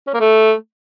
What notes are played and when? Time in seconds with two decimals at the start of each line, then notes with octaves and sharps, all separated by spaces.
0.07 C#4
0.14 A#3
0.20 A3